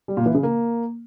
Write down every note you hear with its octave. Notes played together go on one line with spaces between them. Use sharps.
G3
A#2
E3
C#3
A#3